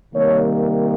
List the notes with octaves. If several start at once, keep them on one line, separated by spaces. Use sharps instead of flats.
C3 D#3 G3 A#3 C#5